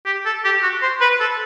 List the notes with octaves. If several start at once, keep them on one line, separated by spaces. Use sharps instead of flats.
G4
A4
G4
F#4
C5
B4
A4